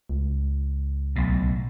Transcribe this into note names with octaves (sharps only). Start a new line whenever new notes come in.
C#2
B1 A2